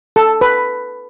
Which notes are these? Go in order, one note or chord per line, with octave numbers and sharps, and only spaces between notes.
A4
B4